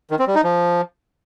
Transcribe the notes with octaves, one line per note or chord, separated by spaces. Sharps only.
D#3
C4
G3
D#4
F3